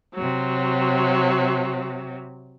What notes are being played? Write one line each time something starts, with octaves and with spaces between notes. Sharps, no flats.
C3 F#3